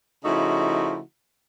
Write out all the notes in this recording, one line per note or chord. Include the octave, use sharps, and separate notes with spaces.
C#3 F3 A3 D#4 E4 F#4